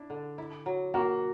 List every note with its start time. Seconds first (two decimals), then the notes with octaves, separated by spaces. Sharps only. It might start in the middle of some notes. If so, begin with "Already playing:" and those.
Already playing: D4 E4
0.10 D3
0.38 E4
0.66 F#3
0.94 A#3 F#4